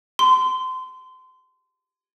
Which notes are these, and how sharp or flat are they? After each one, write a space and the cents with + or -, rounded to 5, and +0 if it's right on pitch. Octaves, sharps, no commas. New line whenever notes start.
C6 -30